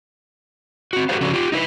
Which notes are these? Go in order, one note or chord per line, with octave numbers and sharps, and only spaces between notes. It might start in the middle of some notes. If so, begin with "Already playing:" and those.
C4 F#4
F#4 G4 A4 B4 C5 F5
C#3 F3 C#4 D4 F#4 A4
F4 G4
D#4 E4 B4